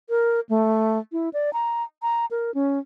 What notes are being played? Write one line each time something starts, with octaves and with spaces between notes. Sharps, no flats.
A#4
A3
E4
D5
A#5
A#5
A#4
C#4